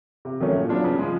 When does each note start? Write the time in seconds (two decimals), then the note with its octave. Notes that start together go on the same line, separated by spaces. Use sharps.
0.25 C3
0.40 D#3 F#3 A3 C#4
0.55 A#2
0.69 F#3 B3 D4 F4
0.84 C#3
0.99 F3 G#3